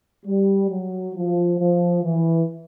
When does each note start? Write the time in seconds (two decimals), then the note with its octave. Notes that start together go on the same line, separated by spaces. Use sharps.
0.26 G3
0.70 F#3
1.15 F3
1.59 F3
2.04 E3